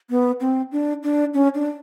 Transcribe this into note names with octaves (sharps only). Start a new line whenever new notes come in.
B3
C4
D4
D4
C#4
D4